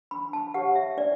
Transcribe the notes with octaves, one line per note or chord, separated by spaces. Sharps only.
D4 B5
A5
G4 C#5 F#5
E5
D4 D5